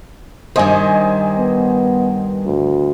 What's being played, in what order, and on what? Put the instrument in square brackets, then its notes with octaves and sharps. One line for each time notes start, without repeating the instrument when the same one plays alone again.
[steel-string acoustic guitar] G2 D#3 [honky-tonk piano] C5 D#5 G#5
[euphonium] B3
D2